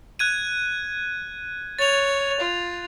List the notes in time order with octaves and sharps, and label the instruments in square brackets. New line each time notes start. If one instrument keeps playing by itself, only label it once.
[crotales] F#6 G#6 D#7
[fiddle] C#5 [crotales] A6 F7
[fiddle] F4